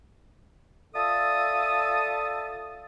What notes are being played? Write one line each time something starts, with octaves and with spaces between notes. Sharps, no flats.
F4 A4 D5 E5 A5 D#6